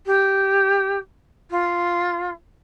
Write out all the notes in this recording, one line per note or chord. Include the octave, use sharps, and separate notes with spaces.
G4
F4